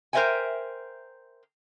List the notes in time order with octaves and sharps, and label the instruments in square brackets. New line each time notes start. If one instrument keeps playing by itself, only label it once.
[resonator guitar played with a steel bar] A#4 C5 D#5 E5 G5 G#5